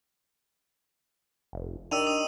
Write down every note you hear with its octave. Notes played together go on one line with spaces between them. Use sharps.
F1
D#3 D4 G4 D5 E6 D#7 F7
D#6